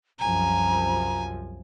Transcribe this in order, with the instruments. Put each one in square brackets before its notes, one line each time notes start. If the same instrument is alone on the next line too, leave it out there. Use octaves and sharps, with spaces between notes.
[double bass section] C2 F#2 F3 [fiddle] G#5 [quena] A#5